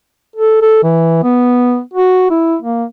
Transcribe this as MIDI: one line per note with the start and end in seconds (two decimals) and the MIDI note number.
0.36 0.59 69
0.62 0.81 69
0.83 1.20 52
1.23 1.80 59
1.93 2.29 66
2.30 2.56 64
2.62 2.84 58